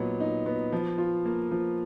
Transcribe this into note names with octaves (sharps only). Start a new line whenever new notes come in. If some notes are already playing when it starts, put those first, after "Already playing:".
Already playing: A#2 F#3 B3 D#4
D#4
B3
F3
F4
A#3
F3